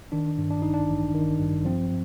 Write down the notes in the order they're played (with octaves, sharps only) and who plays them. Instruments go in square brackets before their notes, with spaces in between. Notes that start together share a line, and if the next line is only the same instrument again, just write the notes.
[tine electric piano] D#3 D4
G2
D4
A1 D#4
D4
A1
D#3
G2
F3 C4